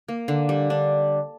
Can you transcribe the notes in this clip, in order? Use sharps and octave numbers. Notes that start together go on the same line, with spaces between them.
A#3
D3
G3
D4